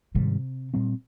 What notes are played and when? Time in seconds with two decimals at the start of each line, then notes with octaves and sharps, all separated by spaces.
0.15 G#2 C3 D#3 G3
0.74 A#2 G3 C4